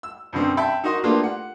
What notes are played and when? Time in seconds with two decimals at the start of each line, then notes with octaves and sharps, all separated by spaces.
0.03 E6
0.33 F#2 B2 D3 C4
0.57 E5 G5 A5 B5
0.84 D#4 F#4 A#4 D#5 C6
1.03 A3 A#3 D4 F4 G4 B4
1.23 F#5